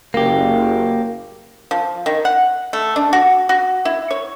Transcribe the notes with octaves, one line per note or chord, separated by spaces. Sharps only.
F#1 A#3 G4
F3
D#3
F#5
A3
D4
F#4
F#4
E4
C#5